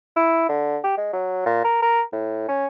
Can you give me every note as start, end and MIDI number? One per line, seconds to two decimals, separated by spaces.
0.16 0.46 64
0.49 0.78 50
0.84 0.96 67
0.97 1.09 56
1.13 1.41 54
1.46 1.61 46
1.64 1.80 70
1.82 2.02 70
2.12 2.46 45
2.48 2.66 61